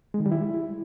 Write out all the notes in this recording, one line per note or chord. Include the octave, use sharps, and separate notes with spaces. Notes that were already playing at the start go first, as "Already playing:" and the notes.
G#3
D#3
G3
E4